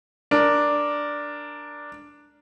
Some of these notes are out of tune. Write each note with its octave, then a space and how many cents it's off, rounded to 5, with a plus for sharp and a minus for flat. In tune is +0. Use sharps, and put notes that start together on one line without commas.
D4 +0 A#4 +0